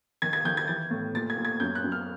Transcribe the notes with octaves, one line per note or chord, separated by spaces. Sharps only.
D#3 G#6
G#6
D#3 G6
G#6
E3 A6
A2
A#2 A6
G#6
A#2
G#6
F#2 G6
F#6
F#2
F6